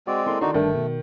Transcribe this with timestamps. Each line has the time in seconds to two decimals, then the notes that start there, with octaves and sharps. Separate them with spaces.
0.07 G#3 C4 F#4 D5
0.26 A#3 E4 A4 C6
0.41 D#3 D4 D#4 F#4
0.54 G1 G2 D#3 A3 D4
0.75 B2